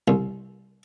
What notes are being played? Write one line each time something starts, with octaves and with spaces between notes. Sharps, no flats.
C2